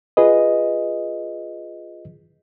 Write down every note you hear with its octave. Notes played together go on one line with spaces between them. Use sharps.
F4 G#4 B4 D#5